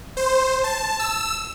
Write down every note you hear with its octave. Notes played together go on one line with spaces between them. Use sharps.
C5
A5
E6